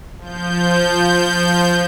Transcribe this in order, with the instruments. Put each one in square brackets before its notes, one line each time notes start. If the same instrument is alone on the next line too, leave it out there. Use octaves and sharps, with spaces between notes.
[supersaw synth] F3 G6